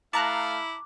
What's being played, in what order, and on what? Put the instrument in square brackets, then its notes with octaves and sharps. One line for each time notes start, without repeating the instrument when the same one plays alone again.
[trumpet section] A3 F5 [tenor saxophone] E4 [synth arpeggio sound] A5 A#5 F#6 [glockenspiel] D6